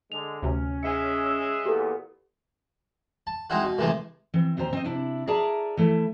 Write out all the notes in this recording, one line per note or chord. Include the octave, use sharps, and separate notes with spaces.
D3 G#3 F7
D2 C3 C#4
G#3 E5 C#7
E6
E2 A#2 B3 G4 A4
A5
G#3 C4 D#4 E4 F#4
B2
A2 C3 E3 G#3 A3
E3 C4
D#2 A#2 G4 C5 A#5
C4 C5 D#5
C3 D4 E4
G#4 A#4 D5 E5 A5 A#5
E3 A3 E4